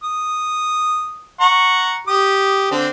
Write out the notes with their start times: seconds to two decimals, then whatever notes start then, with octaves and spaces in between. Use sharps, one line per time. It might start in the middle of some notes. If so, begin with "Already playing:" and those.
0.03 D#6
1.40 F#5 A#5 C#6
2.07 G4 D#6
2.71 D3 C4